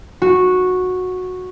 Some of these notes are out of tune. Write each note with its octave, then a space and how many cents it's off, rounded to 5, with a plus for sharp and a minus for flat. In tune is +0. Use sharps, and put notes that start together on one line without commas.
F#4 -10